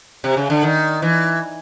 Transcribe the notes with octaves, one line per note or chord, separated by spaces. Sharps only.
C3
C#3
D3
D#3
E3